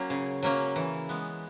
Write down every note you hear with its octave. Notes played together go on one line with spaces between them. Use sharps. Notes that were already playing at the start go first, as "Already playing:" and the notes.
Already playing: F#3 A#3 C#4
C#3
F#3 A#3 C#4
E3
G#3 B3